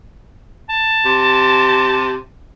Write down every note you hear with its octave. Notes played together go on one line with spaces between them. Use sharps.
A5
C3